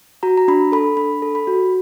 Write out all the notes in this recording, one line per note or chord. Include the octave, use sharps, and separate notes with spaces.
F#4 A#5
A#5
D4 B5
A4 B5
D4 B5
A4
B5
F#4